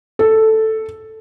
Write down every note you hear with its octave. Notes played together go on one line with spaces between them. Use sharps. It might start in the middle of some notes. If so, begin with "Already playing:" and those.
A4